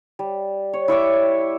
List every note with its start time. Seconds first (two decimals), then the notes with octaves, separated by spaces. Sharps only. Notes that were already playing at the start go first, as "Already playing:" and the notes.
0.19 G3
0.73 C#5
0.88 E4 C#5 E5 D6